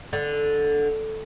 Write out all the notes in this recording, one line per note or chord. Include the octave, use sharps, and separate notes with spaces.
D3